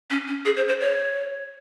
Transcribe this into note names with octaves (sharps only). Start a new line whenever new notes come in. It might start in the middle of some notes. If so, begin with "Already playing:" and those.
C#4
C#4
G#4
C5
C5
C#5